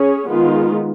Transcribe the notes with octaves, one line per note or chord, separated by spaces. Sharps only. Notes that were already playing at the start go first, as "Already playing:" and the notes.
Already playing: C#4 G#4 C#5
D#3 G#3 B3 F4